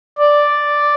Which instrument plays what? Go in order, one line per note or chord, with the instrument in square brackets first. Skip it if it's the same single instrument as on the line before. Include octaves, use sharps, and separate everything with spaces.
[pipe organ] D5